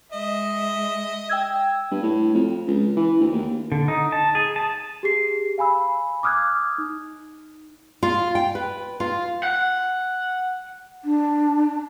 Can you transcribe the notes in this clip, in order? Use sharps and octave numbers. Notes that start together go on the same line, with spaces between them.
G#3 D#5 E5
G5 E6 G#6
G2
A2
F2
C#2
E3
D2
D#2
D3
D#4
A5
G#4
A5
G4 G#4 C7
F5 G#5 B5 E6
D6 D#6 F6 F#6 G#6
D#4
F4
G5
B4
F4
F#5
D4